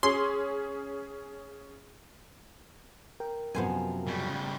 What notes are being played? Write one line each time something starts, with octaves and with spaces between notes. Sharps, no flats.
C#4 G#4 C6
A#4 G5
F#2 C3 F3 B3 C5 G#5
C#3 G3